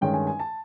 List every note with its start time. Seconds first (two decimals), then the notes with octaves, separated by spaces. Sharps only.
0.01 G2 D#3 G#3 C#4 G5
0.14 G#5
0.27 G#5
0.39 A5